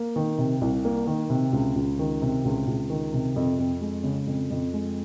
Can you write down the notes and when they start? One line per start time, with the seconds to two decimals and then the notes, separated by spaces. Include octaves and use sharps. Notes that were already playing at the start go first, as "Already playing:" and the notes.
Already playing: A#3
0.16 D#3
0.38 C3
0.61 C2
0.85 A#3
1.07 D#3
1.30 C3
1.53 C#2
1.76 C#2
1.99 D#3
2.22 C3
2.45 C#2
2.67 C#2
2.90 D#3
3.13 C3
3.36 F2
3.59 F2
3.81 G#3
4.04 C#3
4.27 F2
4.51 F2
4.73 G#3